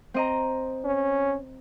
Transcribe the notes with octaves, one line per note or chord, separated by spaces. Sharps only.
C4 D#5 A#5
C#4